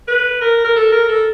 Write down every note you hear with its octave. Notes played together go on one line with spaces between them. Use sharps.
B4
A#4
A#4
A4
A#4
A4